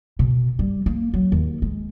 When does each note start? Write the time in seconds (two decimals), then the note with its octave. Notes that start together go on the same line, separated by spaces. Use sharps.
0.19 B2
0.59 G3
0.86 A#3
1.13 F#3
1.32 D#2
1.62 G#3